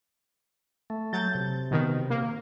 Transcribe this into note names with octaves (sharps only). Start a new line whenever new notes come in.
A3
F#3 G6 A6
C3
B2 D#3
A#3